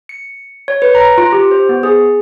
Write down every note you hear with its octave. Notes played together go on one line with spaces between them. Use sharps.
C#7
C#5
B4
A#5
F4
G4
C5
B3
G#4